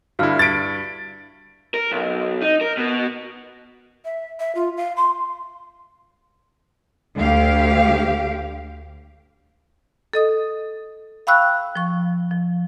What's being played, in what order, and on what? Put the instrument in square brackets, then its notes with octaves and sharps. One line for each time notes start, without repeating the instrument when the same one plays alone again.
[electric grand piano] G2 D3 E4 [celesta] F#4 F5 F6
[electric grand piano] G2 [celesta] G#6 B6 [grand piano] A6 D7
[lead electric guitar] A#4
B1
D#4
A#4
B2
[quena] E5
E5
F4
F5
C6
[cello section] D2 G4 F5
[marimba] A4 D#5 D#6
F5 G5 B5 C#6 E6 F#6
F3 C#6
F3